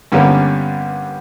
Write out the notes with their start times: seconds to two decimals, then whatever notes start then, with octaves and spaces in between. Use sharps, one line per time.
0.12 G2 D3 G3 A#3 B3 C#4